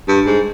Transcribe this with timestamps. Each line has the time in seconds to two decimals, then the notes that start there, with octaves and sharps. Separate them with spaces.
0.08 G2
0.26 G#2